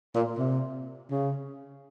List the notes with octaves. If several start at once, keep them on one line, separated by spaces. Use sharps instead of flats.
A#2
C3
C#3